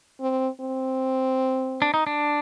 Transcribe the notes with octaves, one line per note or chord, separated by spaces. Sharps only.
C4
C4
D4
D#4
D4